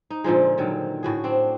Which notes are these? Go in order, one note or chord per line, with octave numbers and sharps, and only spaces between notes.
D#4
A#2 D3 F3 G#3
D3 D#3 F#3
A2 F#4 G#4
C4 D4